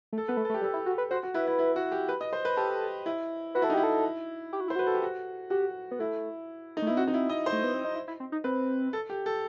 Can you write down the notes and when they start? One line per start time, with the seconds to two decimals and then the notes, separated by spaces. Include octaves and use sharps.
0.13 A3
0.18 A4
0.28 B3 B4
0.37 A3
0.45 A4
0.50 A3
0.54 G4
0.61 G3
0.64 A4
0.73 E4
0.86 F#4
0.98 B4
1.10 F#4 C5
1.23 F#4
1.34 E4 B4
1.47 E4
1.59 E4
1.76 F#4
1.92 G4
2.09 B4
2.21 D#5
2.33 C5
2.45 B4
2.57 G4 A4
3.06 E4
3.55 F#4 B4
3.62 E4 A4
3.70 D#4
3.74 E4 G4
3.83 A4
4.53 G4
4.61 F#4
4.68 E4 C5
4.76 F#4 B4
4.87 A4
4.95 G4
5.02 F#4
5.50 F#4 G4
5.91 B3
5.99 A3 E4
6.77 D#4
6.82 A3
6.87 B3 E4
6.97 C4 F#4
7.07 D#4
7.14 E4
7.29 D#5
7.46 C5
7.52 A3
7.64 B3
7.74 C4
7.85 D#4
7.95 E4
8.08 E4
8.20 C4
8.32 D#4
8.44 C4 B4
8.93 A4
9.10 G4
9.26 A4